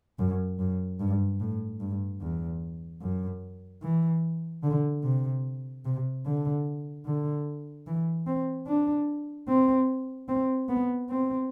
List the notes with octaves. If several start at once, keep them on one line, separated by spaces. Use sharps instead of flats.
F#2
F#2
G2
A2
G2
E2
F#2
E3
D3
C3
C3
D3
D3
E3
C4
D4
C4
C4
B3
C4